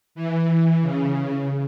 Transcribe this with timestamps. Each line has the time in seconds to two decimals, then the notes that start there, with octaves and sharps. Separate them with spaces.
0.15 E3
0.82 C#3